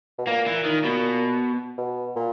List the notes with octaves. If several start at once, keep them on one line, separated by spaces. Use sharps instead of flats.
B2
A#2 A#3
E3
D#3
B2
B2
A#2